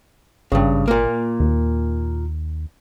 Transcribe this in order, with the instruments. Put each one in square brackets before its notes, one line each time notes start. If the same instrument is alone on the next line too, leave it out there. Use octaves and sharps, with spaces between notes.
[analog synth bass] G#1 [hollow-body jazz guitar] G2 C#3
[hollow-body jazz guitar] A#2 A#3
[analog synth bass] D#2